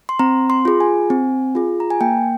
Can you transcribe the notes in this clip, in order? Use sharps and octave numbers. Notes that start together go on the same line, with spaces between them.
C6
C4 A#5
C6
F4 G#4
G#5
C4
F4 G#4
A#5
G#5
A#3 G5